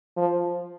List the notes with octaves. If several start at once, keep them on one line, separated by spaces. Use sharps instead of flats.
F3